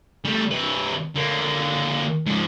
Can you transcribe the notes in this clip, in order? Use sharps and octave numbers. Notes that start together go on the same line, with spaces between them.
G3 A3
C3 B4
D3 A#3
G#2 F3